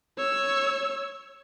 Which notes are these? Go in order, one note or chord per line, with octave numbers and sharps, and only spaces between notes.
C#5 E6